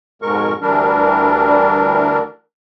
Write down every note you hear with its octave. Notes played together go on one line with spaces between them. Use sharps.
F2 G#2 B2 G#3 A#4 C#6
D2 E3 G3 D4 A#4